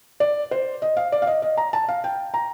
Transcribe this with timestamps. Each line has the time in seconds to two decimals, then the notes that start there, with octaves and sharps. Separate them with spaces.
0.20 D5
0.51 C5
0.82 D#5
0.97 F5
1.12 D5
1.22 F5
1.27 D#5
1.42 D#5
1.57 A#5
1.73 A5
1.88 F5
2.04 G5
2.34 A#5